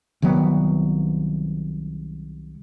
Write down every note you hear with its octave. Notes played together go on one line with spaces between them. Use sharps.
C2 D#3 F#3 B3